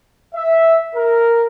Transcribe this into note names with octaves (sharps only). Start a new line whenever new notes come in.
E5
A#4